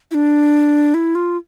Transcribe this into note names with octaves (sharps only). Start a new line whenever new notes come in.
E4
D4
E4
F4